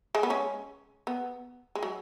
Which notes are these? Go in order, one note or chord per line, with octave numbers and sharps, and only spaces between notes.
G#3
B3
G#3 C#4
B3
G#3
F#3